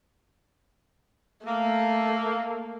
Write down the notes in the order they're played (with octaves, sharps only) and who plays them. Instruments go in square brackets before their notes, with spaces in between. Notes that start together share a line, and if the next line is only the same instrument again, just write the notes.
[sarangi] A3 [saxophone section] A#3